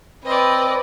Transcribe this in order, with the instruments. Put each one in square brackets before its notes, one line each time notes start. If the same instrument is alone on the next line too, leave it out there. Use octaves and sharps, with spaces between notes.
[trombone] C4 [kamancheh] B4 [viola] D5 D#5